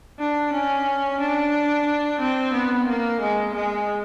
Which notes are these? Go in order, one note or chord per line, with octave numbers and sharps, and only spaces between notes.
D4
C#4
D4
C4
B3
A#3
G#3
G#3